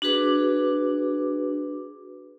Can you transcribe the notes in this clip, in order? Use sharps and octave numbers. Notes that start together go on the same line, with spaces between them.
D4 F#4 G#4 B4 D6